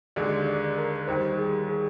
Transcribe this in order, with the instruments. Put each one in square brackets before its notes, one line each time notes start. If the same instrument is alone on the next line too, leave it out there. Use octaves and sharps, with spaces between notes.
[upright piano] D#2 D3 G#3 [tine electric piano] D5
[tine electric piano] D5
D5
A#4
[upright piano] D#2 D#3 G3 [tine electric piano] C5
[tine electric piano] G#4
G#4